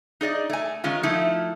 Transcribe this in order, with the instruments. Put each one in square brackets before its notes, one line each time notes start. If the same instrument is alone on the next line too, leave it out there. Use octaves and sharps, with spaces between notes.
[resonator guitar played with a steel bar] D#4 G#4 D5 D#5
A3 G#5
D#3 G#3 C#4 F4
F3 A3 D#4 E4